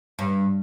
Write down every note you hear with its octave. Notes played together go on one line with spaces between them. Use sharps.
G2